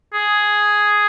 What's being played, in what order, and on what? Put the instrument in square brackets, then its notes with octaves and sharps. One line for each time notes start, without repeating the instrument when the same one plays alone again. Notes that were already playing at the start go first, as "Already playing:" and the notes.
[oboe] G#4